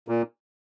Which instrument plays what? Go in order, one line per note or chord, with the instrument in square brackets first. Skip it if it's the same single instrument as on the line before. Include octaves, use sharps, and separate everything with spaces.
[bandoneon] A#2